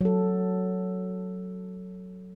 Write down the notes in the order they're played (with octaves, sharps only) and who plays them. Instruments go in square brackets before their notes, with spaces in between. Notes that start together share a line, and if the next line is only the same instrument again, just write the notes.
[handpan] F#3 A4